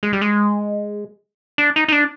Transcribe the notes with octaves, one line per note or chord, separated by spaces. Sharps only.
G#3
G3
G#3
D4
D#4
D#4
D4